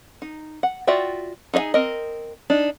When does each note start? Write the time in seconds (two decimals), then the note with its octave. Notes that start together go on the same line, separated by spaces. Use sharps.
0.22 D#4
0.63 F#5
0.87 F4 F#4 D5 E5 G5
1.54 D#4 G#4 D#5 E5 G#5
1.74 C4 A#4 D#5
2.50 D4 D#4